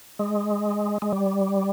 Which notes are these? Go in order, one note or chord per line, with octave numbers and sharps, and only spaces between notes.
G#3
G#3
G3